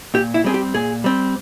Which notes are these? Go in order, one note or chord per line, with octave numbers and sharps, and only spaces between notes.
A#2 G4
E4
G3 C4 G#4
G4
A#2 G#4
G3 C4